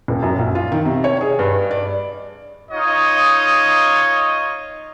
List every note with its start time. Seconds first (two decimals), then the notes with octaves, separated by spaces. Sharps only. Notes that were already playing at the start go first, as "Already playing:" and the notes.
0.08 D#1
0.22 F#2
0.39 A#1
0.55 F4
0.72 D#3
0.85 C3
1.04 C#5
1.21 G#4
1.39 G2
1.71 D5
2.71 D#4 F4 C#5 D#5 D#6